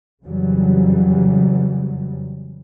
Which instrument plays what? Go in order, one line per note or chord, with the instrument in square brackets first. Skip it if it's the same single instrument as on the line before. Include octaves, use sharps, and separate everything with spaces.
[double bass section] F2 C#3 E3 F#3 G3